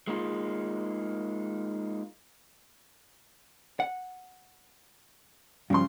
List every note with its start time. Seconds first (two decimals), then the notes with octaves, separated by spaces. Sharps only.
0.07 G#3 A#3 D#4 F4 G#4
3.80 F#5
5.70 G2 C#3 F3 C6